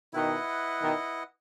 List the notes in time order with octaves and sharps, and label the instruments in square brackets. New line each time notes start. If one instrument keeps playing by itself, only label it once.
[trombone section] B2 D#3 [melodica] E4 B4 D#5 F#5
[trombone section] B2 D#3